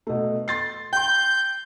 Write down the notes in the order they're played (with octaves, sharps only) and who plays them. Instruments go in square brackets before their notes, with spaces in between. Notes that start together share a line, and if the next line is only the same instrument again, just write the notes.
[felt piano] B2 A3
C6 A6 C7
[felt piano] G5 C6 [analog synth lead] G6